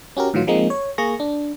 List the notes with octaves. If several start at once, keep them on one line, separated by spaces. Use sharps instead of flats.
C#4 F#4 G4 A#4
A2 D#3 E3 F#3 F4
F3 G#3 A#3 C4 D#4
C#5
A#3 G#4 C#6 A#6
D4